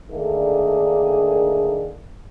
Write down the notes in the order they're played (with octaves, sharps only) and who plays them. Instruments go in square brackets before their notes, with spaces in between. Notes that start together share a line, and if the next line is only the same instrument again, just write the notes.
[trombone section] D3 D#3 A3 A#3 D4 G#4